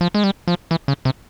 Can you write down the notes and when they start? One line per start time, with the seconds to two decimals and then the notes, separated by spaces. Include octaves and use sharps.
0.01 F3
0.15 G#3
0.24 G3
0.48 F3
0.71 E3
0.88 C#3
1.05 C3